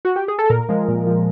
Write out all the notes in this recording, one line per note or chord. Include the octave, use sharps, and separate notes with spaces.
F#4
G4
G#4
A4
A#2 A#4
F3 G#3
A#2
F3 G#3